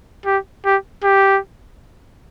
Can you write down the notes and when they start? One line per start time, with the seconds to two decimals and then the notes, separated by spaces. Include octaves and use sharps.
0.26 G4
0.65 G4
1.04 G4